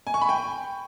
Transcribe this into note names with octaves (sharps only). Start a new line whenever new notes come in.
G#5
C#6
B5
G5